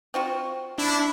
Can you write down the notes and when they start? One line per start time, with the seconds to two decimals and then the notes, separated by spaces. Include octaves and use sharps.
0.14 C4 F4 F#4
0.78 D4 E4 B5